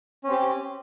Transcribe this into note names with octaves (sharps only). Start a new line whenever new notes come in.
C4 C#4 G4